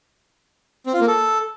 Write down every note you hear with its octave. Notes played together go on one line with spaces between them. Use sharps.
C4
F4
A#3
A4